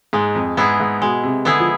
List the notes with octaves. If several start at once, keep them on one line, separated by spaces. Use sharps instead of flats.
G#2 G#3
F2
G#2 B3 E4 G#4
G#2
B2 G#3
C3
D3 B3 E4 G#4
F3